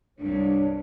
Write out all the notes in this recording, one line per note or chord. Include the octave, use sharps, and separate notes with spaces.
C2 G2 D4 C#5